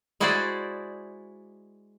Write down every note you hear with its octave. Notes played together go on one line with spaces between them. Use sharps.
G#3 E4 F#4 G#4 C5 D5